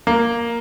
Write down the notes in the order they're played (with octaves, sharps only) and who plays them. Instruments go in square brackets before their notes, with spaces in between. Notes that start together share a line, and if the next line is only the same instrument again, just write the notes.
[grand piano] A#3